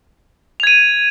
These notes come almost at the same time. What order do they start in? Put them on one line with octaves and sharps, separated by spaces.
F7 G#6 D#7